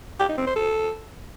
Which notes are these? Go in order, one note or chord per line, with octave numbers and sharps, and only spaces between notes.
G4
D#4
C4
C5
A4